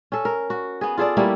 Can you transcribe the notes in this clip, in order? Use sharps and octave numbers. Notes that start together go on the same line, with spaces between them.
C#4 A4
A#4
F#4
B3 G#4
F4 G#4 A4 D5
G3 A3 A#3 E4